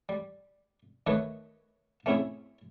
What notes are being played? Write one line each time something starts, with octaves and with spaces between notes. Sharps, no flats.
G3
D#3 A3 B4 C#5 D#5
A3 C4 C#4 E4 G#4 E5